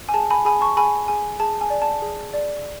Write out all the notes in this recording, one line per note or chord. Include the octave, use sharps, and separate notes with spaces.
G#5
G#4 A5
G#5 B5
G#4 G#5 B5
A5 C#6
G#4 G#5 B5
G#4 G#5
G#4 A5
G#5
D5
A5
G#4
D5